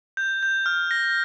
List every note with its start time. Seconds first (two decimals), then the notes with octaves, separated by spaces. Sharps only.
0.17 G6
0.43 G6
0.66 F6
0.91 A#6